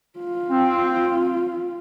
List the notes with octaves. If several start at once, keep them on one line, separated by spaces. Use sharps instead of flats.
F4
C4